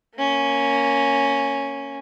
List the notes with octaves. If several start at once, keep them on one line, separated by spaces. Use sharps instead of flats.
A#3 C#4